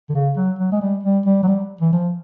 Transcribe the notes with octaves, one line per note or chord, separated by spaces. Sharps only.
D3
C#3
F#3
F#3
G#3
G3
G3
G3
F#3
G3
E3
F3